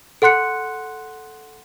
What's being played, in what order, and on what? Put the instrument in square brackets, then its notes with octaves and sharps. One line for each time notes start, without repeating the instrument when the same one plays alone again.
[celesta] A4 F#5 C6 F#6 C#7